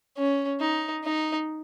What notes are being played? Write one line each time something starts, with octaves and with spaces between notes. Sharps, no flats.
C#4
D#4
D#4